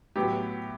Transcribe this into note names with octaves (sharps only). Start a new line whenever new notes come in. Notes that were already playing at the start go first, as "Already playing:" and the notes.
A2 F#3 B3 G4